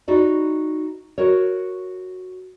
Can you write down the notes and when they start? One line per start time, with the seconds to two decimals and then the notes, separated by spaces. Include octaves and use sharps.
0.08 D#4 E4 F#4 B4 D5
1.18 F#4 A#4 C#5